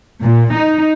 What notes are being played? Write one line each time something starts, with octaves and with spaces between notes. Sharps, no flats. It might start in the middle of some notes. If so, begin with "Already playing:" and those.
A#2
D#4